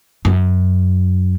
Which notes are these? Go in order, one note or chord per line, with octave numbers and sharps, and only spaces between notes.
F#2